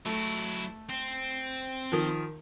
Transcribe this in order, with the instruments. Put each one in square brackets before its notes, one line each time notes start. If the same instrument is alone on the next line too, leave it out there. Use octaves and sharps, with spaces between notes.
[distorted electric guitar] F#3 E4 [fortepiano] A3
[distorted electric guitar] C4
[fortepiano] D#3 F3